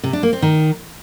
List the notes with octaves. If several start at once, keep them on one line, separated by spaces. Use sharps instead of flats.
C3
D4
A#3
C4
D#3